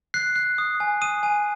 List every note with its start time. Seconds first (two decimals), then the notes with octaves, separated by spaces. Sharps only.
0.14 F#6 C7
0.36 F#6
0.58 D#6
0.80 G#5
1.01 D#6 D#7
1.23 G#5